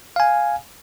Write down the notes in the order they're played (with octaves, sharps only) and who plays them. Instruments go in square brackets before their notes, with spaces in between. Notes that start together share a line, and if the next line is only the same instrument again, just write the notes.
[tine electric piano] F5 G#5